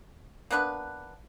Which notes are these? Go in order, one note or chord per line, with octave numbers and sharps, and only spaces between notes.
A#3 B3 D4 B4